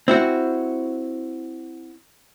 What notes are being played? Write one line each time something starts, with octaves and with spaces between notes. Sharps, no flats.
C4 E4 F#4